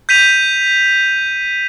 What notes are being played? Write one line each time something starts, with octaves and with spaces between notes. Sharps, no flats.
G6 B6 D#7 F7